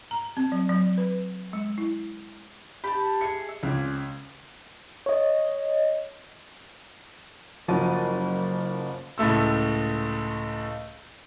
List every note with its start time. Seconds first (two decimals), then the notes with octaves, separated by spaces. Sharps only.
0.11 A#5
0.37 C4
0.52 F#3
0.69 F#3
0.98 B4
1.53 G#3
1.78 E4
2.84 G4 A5 B5
3.21 G#4 E5 C#7
3.49 E5
3.63 C#2 C4 D5 G#5
5.06 C#5 D#5
7.68 F#1 F3 F#3 F#5 A6 D#7
9.18 C#2 A2 A3 E6